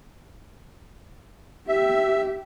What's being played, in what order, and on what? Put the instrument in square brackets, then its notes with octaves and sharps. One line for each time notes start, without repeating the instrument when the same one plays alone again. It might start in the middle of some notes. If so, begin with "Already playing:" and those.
[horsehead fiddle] G4 [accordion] E5